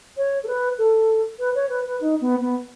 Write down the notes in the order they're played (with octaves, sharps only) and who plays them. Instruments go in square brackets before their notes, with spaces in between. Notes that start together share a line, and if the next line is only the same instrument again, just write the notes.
[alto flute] C#5
A4
B4
A4
B4
C#5
B4
B4
D#4
B3
B3